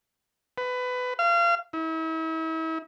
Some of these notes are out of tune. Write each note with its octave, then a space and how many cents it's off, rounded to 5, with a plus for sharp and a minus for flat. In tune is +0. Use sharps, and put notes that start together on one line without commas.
B4 +20
F5 -30
E4 -40